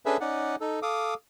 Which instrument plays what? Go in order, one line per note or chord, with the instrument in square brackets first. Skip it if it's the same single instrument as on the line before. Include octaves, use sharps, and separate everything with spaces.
[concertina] C#4 D4 G#4 A4 B4 E5
C#4 D#4 D5 F#5
D#4 A4
A4 F5 D6 D#6